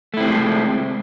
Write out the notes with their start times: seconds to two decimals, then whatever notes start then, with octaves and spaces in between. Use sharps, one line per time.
0.14 A3
0.17 E4
0.20 C4
0.24 C3
0.27 G#3